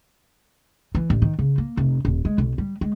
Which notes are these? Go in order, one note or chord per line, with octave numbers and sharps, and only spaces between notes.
E3
A1
D#3
C#3
A#3
F1
D#1
G#3
B1
G3
G#3